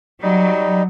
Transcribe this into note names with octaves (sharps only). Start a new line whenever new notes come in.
F#3 G3 D#4